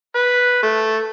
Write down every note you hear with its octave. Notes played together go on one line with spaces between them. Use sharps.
B4
A3